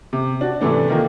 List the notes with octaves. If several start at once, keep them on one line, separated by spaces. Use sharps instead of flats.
C3
D4 F#4
A2 C3 E3 A3 D4
D3 D#3 F3 A#3